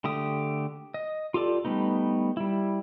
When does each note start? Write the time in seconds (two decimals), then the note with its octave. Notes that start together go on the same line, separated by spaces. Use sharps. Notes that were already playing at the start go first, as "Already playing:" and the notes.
0.04 D3 A3 G4 D#6
0.94 D#5
1.34 F4 G4 A4 D5
1.65 G3 A3 B3 D#4
2.37 G3 E4